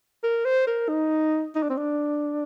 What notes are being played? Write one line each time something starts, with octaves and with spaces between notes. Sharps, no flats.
A#4
C5
A#4
D#4
D#4
D4
C4
D4